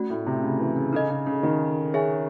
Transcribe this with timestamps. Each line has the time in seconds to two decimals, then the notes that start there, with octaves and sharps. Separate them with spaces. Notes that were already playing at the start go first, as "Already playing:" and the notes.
Already playing: A3 C#4 F#4
0.10 A2
0.26 C3
0.42 C#3
0.60 E3
0.76 C#3
0.93 C#3 D#4 A4 D#5
1.09 C#3
1.26 C#3
1.43 D#3
1.94 C#4 G#4 C#5 E5 G#5